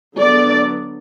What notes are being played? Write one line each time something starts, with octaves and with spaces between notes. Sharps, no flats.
D3 F#3 B3 D5